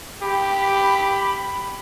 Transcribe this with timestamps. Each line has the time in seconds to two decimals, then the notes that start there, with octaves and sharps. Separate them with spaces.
0.22 G4 B5